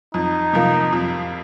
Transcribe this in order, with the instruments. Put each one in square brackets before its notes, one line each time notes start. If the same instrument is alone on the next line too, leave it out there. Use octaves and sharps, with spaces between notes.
[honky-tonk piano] F2 [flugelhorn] D#4
[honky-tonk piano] C3 F3 A#3
F2